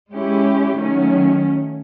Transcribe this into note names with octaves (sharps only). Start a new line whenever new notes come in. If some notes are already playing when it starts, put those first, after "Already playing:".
G#3 C#4 E4 G4
D#3 F#3 A3 C#4